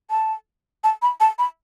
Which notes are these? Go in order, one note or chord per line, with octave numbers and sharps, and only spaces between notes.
A5
A5
B5
A5
B5